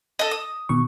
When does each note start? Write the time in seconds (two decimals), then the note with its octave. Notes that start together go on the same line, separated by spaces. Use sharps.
0.19 A4 D#5
0.31 D#6
0.69 B2 D#3 C#6